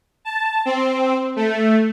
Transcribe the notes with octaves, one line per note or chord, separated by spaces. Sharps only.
A5
C4
A3